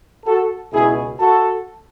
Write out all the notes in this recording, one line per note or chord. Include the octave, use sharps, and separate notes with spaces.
F#4 A4
C#2 B2 E4 G#4
F#4 A4